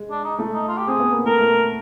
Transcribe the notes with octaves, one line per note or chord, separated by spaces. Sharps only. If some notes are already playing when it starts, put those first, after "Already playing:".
Already playing: G#3
D4
D#4
A3
D#4
F4
G4
C4 G#4
B3
A#3
A3 A#4
A3